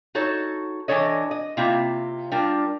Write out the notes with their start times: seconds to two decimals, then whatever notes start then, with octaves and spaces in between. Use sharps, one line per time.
0.15 D#4 F#4 A4 C#5
0.88 E3 D4 A4 C#5 D#5
1.31 D#5
1.57 C3 A#3 C4 E4 F4
2.31 G3 D4 F4 A#4